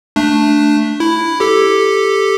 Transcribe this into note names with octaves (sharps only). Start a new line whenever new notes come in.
A3 D4
E4
G4 A4